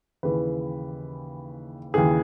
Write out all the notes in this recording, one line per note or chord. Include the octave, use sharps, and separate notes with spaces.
D#2 C#3 E3 B4
D#2 C#3 E3 G#4